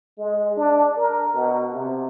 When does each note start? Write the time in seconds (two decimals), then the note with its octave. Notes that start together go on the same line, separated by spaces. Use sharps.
0.18 G#3
0.57 D4
0.97 A#4
1.34 B2
1.73 C3